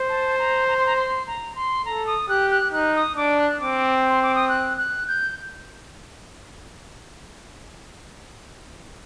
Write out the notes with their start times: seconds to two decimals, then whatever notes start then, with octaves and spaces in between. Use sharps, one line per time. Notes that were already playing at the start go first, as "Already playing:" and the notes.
Already playing: C5
0.09 A5
0.38 A#5
0.68 A#5
0.77 C6
0.86 A#5
0.97 C6
1.27 A#5
1.56 C6
1.85 A4 A#5
2.07 D#6
2.29 G4 F#6
2.50 F#6
2.73 D#4 F#6
2.95 D#6
3.17 D4 D6
3.38 F#6
3.60 C4 D6
4.10 C6
4.23 D6
4.35 D#6
4.49 F#6
4.78 F#6
5.08 G6